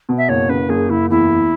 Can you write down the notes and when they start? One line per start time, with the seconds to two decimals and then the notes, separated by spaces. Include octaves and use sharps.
0.09 B2
0.17 E5
0.28 F#1 C#5
0.49 C#3 B4
0.69 F#1 G#4
0.89 F#1 E4
1.10 E2 E4
1.29 E2